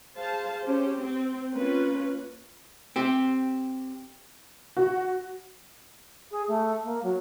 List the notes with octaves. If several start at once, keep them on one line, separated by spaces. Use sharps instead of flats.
G#4 C5 F5 A5
C#4 G4 C5
C4
A#3 C#4 F4 B4
C4 G4
F#4
G#4
A3
A#3
F#3